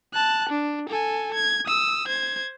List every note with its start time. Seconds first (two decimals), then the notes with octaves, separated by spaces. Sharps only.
0.14 A5 F#6
0.49 D4
0.89 A4 G#5
1.34 G#6
1.66 D#6 E6
2.08 C5 G#6